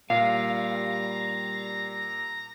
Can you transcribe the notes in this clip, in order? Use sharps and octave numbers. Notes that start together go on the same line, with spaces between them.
A#2 G3 F5 A#5